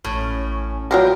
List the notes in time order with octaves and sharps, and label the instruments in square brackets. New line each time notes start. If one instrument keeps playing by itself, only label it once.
[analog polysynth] A1 C#4 [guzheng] A2
[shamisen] D#3 F3 F#3 [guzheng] A#4 [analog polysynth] B4 G5